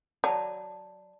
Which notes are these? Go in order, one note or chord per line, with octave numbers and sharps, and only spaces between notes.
F#3 D5 A5 B5